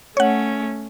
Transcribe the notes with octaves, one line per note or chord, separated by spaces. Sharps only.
A3 C#4 C#5 F#5